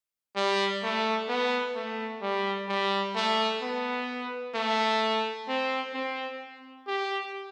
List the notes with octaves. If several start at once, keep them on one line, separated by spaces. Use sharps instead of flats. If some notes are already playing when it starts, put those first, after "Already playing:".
G3
A3
B3
A3
G3
G3
A3
B3
A3
C4
C4
G4